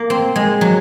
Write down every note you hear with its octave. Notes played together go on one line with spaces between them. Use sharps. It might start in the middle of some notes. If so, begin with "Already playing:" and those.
Already playing: A#3
C4
G#3
F#3